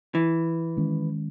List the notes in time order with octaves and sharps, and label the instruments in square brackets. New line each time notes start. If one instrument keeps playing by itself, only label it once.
[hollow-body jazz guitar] E3
[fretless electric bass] D#3 G#3 C#4